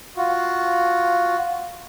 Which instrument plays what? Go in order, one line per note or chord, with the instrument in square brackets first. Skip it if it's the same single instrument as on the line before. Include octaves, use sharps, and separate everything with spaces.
[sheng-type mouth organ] F4 F#4